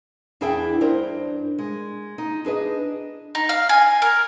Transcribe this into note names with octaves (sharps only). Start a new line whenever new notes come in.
E2 D4 E4 G#4 E5 G5
G2 D4 A#4 C5
G#3
D#4
D4 G#4 B4 D#5
D#4
F5
G#5
A#4